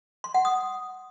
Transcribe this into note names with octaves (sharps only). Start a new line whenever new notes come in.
C6
F#5
D#6